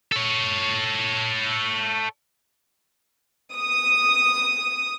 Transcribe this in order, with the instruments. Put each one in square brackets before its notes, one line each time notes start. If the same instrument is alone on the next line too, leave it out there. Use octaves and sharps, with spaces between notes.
[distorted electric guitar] A4 C#5
[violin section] D#6